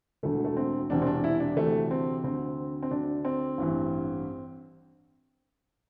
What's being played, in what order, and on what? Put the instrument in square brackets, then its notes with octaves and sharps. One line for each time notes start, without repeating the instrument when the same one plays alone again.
[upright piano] E1 D2 D3 A3
A3
C4
E1 E2 C3 D4
C4
D4
E4
D4
D2 C3 E3 A3
C4
D2 D3 C4
C4
D2 D3 D4
C4
A1 G2 E3